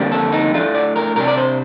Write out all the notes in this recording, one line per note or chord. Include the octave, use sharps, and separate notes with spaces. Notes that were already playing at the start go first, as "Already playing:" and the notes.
Already playing: F2 D3 G3 A#3
A4
D#4
A2 A3 D4 F4
D5
A#4
C2 C3 G3 D4 A#4
D5
C5